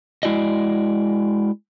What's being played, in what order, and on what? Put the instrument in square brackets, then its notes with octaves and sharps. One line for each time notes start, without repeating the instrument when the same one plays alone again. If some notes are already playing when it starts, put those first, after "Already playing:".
[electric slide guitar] G#3 E4 F#4 D5 D#5